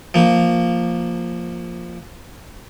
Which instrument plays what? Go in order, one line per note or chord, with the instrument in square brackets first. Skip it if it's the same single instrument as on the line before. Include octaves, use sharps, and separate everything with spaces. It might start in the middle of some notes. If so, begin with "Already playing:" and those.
[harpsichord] F3 A#3